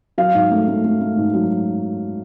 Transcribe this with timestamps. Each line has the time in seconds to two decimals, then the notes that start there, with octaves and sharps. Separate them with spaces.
0.18 F#3 F5
0.35 G#2
0.51 A3
0.68 A3
0.84 A3
1.01 A3
1.17 G#2
1.34 F#3